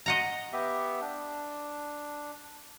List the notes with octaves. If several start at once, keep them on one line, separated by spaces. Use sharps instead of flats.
D#5 F#5 A#5
B3 G4 E5
D4